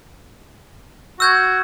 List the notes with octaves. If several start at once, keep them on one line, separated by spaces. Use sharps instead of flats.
F#4 E6 G6 G#6